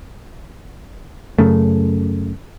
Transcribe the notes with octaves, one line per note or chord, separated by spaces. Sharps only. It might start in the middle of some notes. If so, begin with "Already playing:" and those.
F#2 C#3 A3